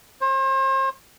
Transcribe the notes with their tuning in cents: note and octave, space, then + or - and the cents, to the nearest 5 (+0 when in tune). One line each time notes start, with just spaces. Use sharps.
C5 +40